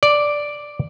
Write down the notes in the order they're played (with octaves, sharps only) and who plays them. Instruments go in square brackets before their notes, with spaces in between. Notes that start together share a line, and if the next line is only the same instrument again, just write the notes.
[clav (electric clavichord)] D5